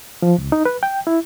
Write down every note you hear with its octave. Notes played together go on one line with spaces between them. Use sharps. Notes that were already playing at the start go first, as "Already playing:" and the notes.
F3
C#2
D#4
B4
G5
E4